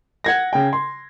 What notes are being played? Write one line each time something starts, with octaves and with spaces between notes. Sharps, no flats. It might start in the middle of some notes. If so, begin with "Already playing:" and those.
F#5 G#6 A#6
C#3 G5
C6